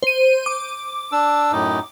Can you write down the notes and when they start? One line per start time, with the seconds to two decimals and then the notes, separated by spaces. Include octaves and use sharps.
0.03 C5 D#7
0.46 D6
1.12 D4 E6
1.52 F#2 A2 D#4